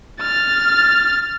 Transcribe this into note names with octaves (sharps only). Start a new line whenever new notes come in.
F6 A6